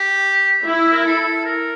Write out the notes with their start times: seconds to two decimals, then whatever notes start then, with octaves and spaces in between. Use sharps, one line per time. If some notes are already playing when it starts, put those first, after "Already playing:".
Already playing: G4
0.65 E4
0.92 A#4
1.05 A4
1.45 A#4